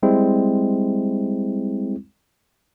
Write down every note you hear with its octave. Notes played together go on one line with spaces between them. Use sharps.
G3 G#3 C4 E4